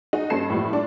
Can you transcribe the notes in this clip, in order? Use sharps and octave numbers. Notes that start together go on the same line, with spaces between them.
D#4 F#4 G#4
G2 C#4 A4 C7 E7
A2 E3 F3 G3
D4